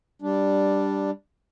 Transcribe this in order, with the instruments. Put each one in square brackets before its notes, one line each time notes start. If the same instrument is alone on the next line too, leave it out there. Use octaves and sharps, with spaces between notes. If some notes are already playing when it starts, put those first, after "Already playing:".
[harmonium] G3 D4